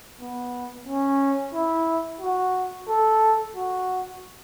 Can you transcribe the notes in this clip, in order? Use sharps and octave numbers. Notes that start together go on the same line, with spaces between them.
B3
C#4
E4
F#4
A4
F#4